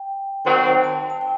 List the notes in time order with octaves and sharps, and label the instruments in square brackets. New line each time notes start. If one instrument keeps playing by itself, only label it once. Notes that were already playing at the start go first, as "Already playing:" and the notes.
Already playing: [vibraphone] G5
[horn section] D#3 F#3 C4 [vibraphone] G5
[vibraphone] A5
A5
G5